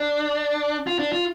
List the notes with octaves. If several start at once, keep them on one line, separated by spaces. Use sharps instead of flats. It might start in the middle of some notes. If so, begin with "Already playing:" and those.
Already playing: D4
F4
D4
F4